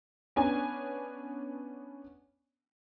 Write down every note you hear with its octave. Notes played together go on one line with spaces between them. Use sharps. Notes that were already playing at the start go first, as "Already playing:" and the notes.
B3 C#4 D4 G#5